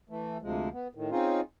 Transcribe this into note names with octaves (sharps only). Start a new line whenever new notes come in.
E3 A3
D2 C3 F3 G#3
B3
A2 D#3
C4 C#4 D#4 F4 G#4